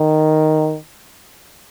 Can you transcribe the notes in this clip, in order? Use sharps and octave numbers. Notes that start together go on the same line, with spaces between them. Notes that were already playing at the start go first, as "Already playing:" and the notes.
Already playing: D#3